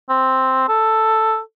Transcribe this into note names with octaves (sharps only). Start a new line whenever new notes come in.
C4
A4